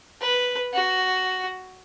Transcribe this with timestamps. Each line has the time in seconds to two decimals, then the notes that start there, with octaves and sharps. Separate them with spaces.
0.21 B4
0.73 F#4